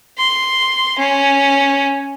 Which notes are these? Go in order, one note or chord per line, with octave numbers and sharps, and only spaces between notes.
C6
C#4